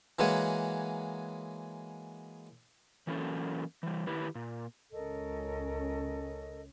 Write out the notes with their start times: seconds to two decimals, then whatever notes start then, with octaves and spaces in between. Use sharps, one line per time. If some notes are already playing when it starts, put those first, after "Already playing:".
0.19 E3 F#3 G#3 A#3 F#5 G#5
3.07 E3 F#3 A#3 C#4 A4
3.83 E3 G3
4.07 D#3 E4 G4 B4
4.35 A#2
4.93 C#2 C#4 A4 A#4 D#5